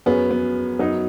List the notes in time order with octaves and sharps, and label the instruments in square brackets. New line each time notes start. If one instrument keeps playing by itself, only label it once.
[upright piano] F#2 F#3 C#4 G#4 [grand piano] B3
[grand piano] B3
[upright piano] F#2 F#3 D#4